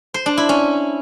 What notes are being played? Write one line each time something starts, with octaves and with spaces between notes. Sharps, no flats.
C5
D4
E4
C#4